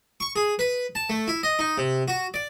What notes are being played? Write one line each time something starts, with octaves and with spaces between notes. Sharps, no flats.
C#6
G#4
B4
A5
A3
E4
D#5
D#4
C3
F#4
D5